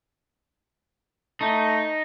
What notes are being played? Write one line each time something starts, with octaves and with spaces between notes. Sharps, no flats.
A3 D#4